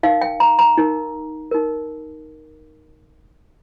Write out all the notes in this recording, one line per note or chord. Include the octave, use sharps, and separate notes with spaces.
D#4 A#4 F5
G5
A#5
A#5
D#4 A#4
D#4 A#4